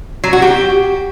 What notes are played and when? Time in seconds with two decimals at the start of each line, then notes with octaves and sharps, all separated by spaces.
0.24 F#3
0.33 F#4
0.42 G4